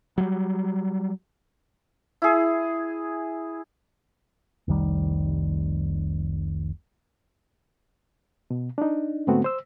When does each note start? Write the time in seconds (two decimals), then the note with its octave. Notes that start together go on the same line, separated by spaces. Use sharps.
0.18 F#3 G3
2.22 E4 G#4
4.68 F1 C2 D#3 G3
8.50 B2
8.78 D4 D#4
9.27 G#2 D3 A3 B3 C4 F#4
9.44 C5 E6